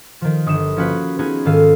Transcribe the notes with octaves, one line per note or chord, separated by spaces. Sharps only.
D#3 F3
G1 D#6 C#7 E7
F3 A#3 C#4 F4 F#4 B4
B3 D#4 F4 G#4 B4 C#5
G#2 D#3 A4 F5 D#7